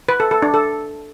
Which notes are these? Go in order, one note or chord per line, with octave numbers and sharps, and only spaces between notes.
B4
A4
A4
D4
A4